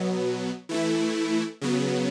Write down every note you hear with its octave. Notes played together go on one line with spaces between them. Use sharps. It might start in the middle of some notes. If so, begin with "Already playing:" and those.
Already playing: B2 F#3 B3
E3 A3 E4
C#3 F#3 B3